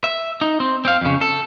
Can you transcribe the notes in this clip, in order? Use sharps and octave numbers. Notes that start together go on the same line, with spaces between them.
E5
D#4
C4
C4 F5
F2 C#3
A4